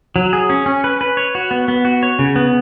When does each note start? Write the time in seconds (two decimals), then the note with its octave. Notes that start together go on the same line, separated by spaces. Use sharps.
0.16 F#3
0.33 G#4
0.50 C#4
0.66 C#4
0.84 B4
1.01 B4
1.17 C#5
1.35 F#4
1.51 B3
1.68 B3
1.85 F#4
2.03 C#5
2.19 C#3
2.36 B3